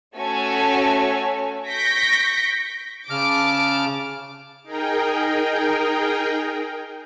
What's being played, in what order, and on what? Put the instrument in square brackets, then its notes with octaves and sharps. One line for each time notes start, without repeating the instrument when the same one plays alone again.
[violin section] A3 C#4 F#4 A4 C#5 G#5
C#6 G6 A#6 B6 D7
[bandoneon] C#3 F6 [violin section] A5 D6
[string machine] D#4 G#4 A#4 G5